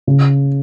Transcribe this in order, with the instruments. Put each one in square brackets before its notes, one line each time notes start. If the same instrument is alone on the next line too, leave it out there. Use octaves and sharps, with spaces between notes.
[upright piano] C#3